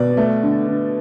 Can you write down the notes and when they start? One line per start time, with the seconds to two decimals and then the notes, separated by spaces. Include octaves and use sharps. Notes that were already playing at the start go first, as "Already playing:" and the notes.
Already playing: B2 D5
0.17 A3
0.43 D3
0.68 D3